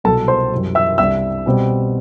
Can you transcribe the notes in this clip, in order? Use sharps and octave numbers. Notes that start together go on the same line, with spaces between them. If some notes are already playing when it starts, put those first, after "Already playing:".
C2 B2 F#3 A4 A5
C5 C6
F#2 E3 G3
E5 E6
C2 C3 G3 D4 E5 E6
B2 G3 C4